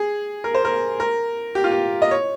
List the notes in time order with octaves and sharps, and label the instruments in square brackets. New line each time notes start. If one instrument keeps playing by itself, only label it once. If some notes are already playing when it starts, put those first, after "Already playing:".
Already playing: [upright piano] G#4
A#4
C5
A#4
A#4
G4
F4
G4
D#5
C#5